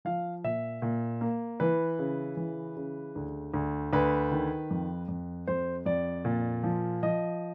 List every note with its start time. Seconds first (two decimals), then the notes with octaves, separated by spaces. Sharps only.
0.05 F3 F5
0.44 A#2 E5
0.82 A#2
1.21 A#3
1.60 E3 B4
1.99 C#3
2.37 E3
2.76 C#3
3.16 D2
3.54 D2
3.93 D2 B4
4.31 D#3
4.71 F2
5.08 F2
5.47 F2 C5
5.86 F2 D5
6.25 A#2
6.63 F3
7.03 F3 D#5